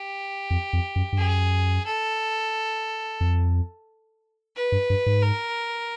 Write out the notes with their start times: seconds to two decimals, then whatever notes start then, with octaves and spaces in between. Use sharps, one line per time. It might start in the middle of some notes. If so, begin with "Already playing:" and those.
Already playing: G4
0.50 F2
0.73 F2
0.96 F#2
1.13 G2
1.18 F#2 G#4
1.86 A4
3.21 F2
4.56 B4
4.72 G2
4.90 G2
5.06 G#2
5.23 A#4